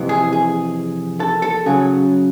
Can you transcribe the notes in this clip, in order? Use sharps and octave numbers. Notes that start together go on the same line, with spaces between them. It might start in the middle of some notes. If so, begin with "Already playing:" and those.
Already playing: F2 C3 E3
G#4
G#4
A4
A4
C#3 F#3 G#4